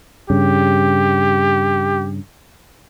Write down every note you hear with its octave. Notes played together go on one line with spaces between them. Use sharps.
G2 C#3 G4